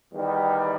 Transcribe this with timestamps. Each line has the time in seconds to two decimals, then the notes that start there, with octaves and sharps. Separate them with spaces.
0.12 E2 D#3 G3